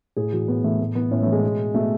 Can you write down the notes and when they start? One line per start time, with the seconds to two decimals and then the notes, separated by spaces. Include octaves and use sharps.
0.16 A2 G#4
0.32 E3 F#4
0.48 A2 B3
0.64 E3 A3
0.80 A2 B3
0.95 E3 B3
1.11 A2 C#4
1.22 A3
1.27 E3
1.32 G#3
1.43 B2
1.74 B2 A3